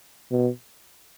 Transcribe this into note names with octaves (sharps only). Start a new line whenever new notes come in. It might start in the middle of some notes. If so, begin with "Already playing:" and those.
B2